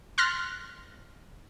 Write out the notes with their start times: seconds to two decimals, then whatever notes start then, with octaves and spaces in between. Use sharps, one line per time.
0.18 C6 F6 F#6 A6 A#6